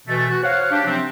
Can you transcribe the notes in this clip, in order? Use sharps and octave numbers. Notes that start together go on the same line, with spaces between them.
B2 E3 A3
F#4
C5 C#5 F5 F#5
D4 G4
C3 F3 F#3 C4